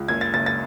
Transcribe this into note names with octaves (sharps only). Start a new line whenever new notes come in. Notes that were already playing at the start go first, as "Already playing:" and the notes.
Already playing: C#2
F#1 G#6
A6
F#1 A6
A6